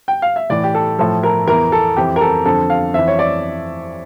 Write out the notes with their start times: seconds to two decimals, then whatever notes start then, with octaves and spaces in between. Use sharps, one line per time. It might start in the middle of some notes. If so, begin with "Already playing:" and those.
0.08 G5
0.22 F5
0.36 E5
0.50 A2 E3 D5
0.64 G4
0.75 A4
0.99 A2 F3 A4
1.23 A#4
1.48 E2 E3 A#4
1.72 A4
1.97 F2 E3 G4
2.16 A#4
2.21 A4
2.45 F2 D3 F3 A4
2.70 F5
2.94 F2 E3 E5
3.07 C#5
3.19 D5